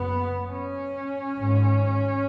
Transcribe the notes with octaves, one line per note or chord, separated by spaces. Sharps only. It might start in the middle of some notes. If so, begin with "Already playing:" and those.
Already playing: F#1 F#2 C#3 B3
C#4
G#1 G#2